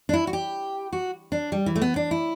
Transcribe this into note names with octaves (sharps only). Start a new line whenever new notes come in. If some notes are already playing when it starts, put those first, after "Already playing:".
D4
E4
F#4
G4
F#4
D4
G3
E3
A3
B3
D4
E4